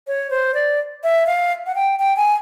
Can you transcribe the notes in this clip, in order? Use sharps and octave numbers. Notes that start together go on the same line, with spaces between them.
C#5
C5
D5
E5
F5
F#5
G5
G5
G#5